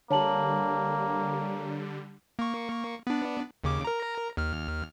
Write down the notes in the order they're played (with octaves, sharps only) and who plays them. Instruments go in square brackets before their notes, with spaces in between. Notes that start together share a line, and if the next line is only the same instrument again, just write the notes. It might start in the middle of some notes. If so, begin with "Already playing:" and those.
[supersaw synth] D3 G3 [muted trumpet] A#3 [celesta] C#5 A5 F#7
[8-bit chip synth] A#3 C#6
B3 D4
D#2 C#3 D6
A#4 A#5
D#2 F6